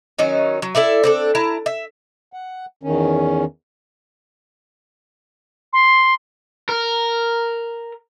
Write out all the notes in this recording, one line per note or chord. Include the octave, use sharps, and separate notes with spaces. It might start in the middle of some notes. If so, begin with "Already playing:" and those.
D#3 F#3 C#4 D#4
F#3
E4 A4 D5 E5
C4 D4 A4
E4 A5 A#5
E5
F#5
E2 D#3 C#4
C6
A#4